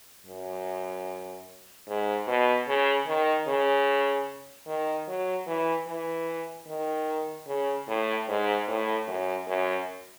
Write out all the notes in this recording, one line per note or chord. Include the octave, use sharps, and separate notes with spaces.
F#2
G#2
B2
C#3
D#3
C#3
D#3
F#3
E3
E3
D#3
C#3
A2
G#2
A2
F#2
F#2